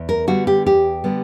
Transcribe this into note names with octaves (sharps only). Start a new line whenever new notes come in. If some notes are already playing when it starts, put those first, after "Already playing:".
Already playing: E2
A#4
D3 G3 B3 F#4
G4
E2 G4
D3 G3 B3